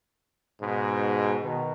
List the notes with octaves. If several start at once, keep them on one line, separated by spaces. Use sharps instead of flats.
G#2 B2
B2 D#3